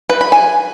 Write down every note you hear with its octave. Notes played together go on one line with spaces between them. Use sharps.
B4
B5
G#5